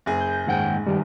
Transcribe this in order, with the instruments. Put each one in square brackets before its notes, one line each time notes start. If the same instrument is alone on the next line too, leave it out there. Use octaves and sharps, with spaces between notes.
[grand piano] F#1 G#4
[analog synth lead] G6
[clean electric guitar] D#2 F#5 G5 [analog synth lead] G#2
[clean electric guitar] G2 D#3 G4 [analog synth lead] G3